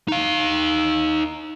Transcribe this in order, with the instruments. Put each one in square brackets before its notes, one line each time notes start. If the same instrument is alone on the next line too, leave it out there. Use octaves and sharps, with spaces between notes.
[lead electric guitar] D#4 F5